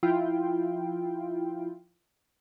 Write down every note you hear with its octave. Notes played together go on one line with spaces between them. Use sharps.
F3 E4 F4 G5